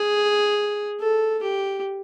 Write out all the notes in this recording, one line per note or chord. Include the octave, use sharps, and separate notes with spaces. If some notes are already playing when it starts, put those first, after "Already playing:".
Already playing: G#4
A4
G4